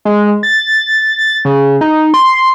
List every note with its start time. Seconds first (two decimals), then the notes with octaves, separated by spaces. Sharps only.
0.05 G#3
0.43 A6
1.18 A6
1.45 C#3
1.81 D#4
2.14 C6